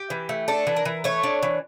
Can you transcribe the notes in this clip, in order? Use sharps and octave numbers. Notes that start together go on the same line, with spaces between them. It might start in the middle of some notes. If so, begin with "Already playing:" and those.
Already playing: G4
E3
A3
D4 A4
E3
A#4
E3
A3 C#5
D4
E3